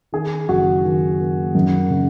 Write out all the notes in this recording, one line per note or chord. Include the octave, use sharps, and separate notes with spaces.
D#3 G#4
F#1 F#4
D#3
A#3
F#2
C#3